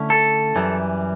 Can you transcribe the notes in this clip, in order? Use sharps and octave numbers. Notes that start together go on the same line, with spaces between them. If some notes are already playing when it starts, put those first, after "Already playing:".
Already playing: D3 A3 C#4 E4
A4
F#2 E3 G3